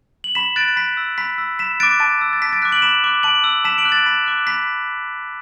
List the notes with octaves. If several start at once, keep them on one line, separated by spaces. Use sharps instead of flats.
F#7
B5 B6 E7
F#6 A6 D7
B5 B6
E6
B5 B6
E6
B5 B6 E7
D6 F#6 A6 D7
A5 A6
E6
A6
A5 B6
A6 D7
D6 F#6 B6
D7 F#7
B5 B6 E7
D6 F#6
A5 D7 F#7
E6
A5 B6 E7
D7 F#7
D6 F#6
A6 D7
B5 B6 E7
D6 F#6
B5 B6